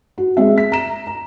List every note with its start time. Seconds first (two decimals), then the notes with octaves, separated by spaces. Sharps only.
0.18 F#4
0.37 G#3 C4 E5
0.58 B6
0.72 A#5 E7
1.07 A#5